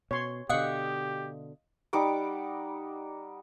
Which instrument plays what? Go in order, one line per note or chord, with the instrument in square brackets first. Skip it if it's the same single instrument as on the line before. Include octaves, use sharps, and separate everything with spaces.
[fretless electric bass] B2 [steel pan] C#5 C6
[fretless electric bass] B2 D3 [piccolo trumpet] G4 [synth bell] D#5 F5 D#6 [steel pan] F#5
[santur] G3 D#4 F#5 D6